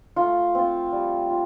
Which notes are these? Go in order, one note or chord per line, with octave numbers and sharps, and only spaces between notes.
A3 F4
C4 F4
G3
F4